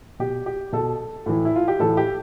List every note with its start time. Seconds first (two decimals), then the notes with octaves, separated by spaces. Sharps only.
0.20 B2 G4
0.46 G4
0.72 B2 A4
1.26 A2 E3
1.45 E4
1.56 F4
1.68 G4
1.79 A2 E3 A4
1.97 G4